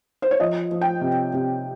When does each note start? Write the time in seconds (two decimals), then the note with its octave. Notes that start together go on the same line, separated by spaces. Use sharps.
0.22 C5
0.31 C#5
0.40 F3 D#5
0.71 F3
0.81 G5
1.01 C3
1.33 C3